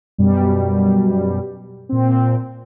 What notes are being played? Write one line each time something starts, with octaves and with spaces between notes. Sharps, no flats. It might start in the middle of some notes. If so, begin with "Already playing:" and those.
F#2 B2 G3
A#2 C4